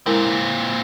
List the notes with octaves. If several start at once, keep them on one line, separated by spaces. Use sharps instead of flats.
A#2 G#3 C4 E4 A#4